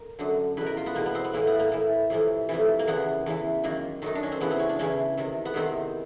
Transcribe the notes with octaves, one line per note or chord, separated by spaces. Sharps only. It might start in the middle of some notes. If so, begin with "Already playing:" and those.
Already playing: A#4
F#2 D3
E2 B2 B4
A#4
F4
B3
E2 B2 A#3
B3
C4
B3
A2 E3 A#3
B3
A#3
A2 E3
F2 C3 E3
F2 C3 E3
A#3
E2 C#3 E3 B3
E2 C#3 E3
F#2 D#3 A#3
F#2 D#3 D#4
D4
C#4
C4
E2 C#3 E3 B3
C4
C#4
D4
E2 C#3 E3 C#4
E2 C3 D#3
B3
E2 C3 D#3 C4